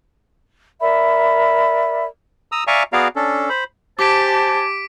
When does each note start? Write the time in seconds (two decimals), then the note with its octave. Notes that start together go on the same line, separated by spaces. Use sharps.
0.81 A#4 D5 E5 B5
2.52 A#5 D#6 E6
2.67 D5 E5 F5 G#5 A#5 C#6
2.93 B3 F#4 G#4 D5 F5 A#5
3.16 C#4 D4 A4
3.49 C5 B5
3.99 G4 C5 G#5 A5 D6 B6 D7